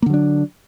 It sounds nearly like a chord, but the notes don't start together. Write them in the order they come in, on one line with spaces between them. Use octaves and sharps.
A#3 D3 F#3 D4